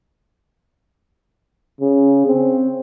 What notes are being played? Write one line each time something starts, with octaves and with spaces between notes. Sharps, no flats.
C#3
C4